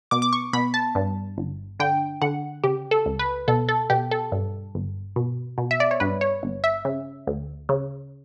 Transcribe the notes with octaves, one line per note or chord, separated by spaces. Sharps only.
B2 D6
D6
C#6
B2 B5
A5
G2
G1
D3 G5
D3 F#5
C#3 G4
A4
C#2
B4
B2 A4
A4
B2 G4
A4
G2
G1
B2
B2
E5
D5
C#5
G2 B4
C#5
G1
E5
C#3
D2
C#3